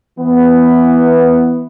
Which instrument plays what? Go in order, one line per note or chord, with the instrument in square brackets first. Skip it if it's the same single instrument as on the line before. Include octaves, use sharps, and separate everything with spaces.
[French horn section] E3 B3